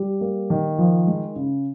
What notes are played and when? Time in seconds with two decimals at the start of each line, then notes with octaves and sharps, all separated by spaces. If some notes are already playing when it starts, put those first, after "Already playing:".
Already playing: G3
0.21 A#3
0.50 D#3
0.78 F3
1.07 G#3
1.36 C#3